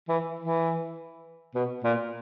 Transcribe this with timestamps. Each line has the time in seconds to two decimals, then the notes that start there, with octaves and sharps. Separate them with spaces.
0.09 E3
0.39 E3
1.55 B2
1.84 A#2